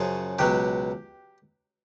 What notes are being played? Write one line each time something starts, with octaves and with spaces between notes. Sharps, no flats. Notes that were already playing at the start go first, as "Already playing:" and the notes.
Already playing: F#2 C#3 F3 G#4
C#2 B2 F#3 G4